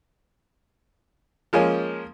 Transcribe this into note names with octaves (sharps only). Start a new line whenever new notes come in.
F3 G#3 A#3 C#4